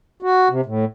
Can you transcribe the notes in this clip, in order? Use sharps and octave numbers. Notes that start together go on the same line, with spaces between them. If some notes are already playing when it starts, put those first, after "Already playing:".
F#4
C3
A2